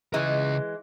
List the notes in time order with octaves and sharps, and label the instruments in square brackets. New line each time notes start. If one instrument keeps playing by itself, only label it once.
[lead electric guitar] C#3 D#5 [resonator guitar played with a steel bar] E3 G#3